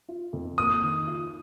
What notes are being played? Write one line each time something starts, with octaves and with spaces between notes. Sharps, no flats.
F4
F2
A#3 D#6
D#3
F4